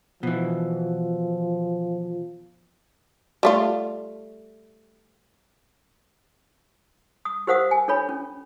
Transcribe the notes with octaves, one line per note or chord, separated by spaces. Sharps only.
B2 E3 F3
G3 A3 F4
D#6
G4 A#4 C5 F5 F#5 D#6
G#5
D4 A4 C#5 B5
C#4